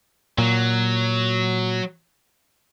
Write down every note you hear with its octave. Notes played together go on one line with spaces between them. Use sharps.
A#2 F#3